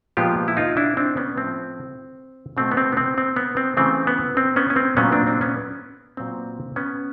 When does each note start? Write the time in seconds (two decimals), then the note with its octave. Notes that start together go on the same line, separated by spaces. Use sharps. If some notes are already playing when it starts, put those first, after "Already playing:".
0.17 A#2 F3 G#3 B3 F4 G4
0.48 E4
0.57 D#4 F4
0.77 D4 E4
0.97 C4 D4
1.17 B3 C#4
1.37 A2 F3 A3 C4
2.57 B2 F#3 A3 C4
2.71 B3
2.77 C4
2.92 B3
2.97 C4
3.18 C4
3.37 B3
3.57 C4
3.77 C#3 E3 A3 C4
4.07 B3
4.37 C4
4.56 B3 C#4
4.70 C#4
4.76 C4
4.97 A#2 F#3 A3 B3 C#4
5.12 C4 D4
5.27 C4 D4
5.41 B3 C#4
6.17 A#2 F#3 B3 C4
6.76 B3 C#4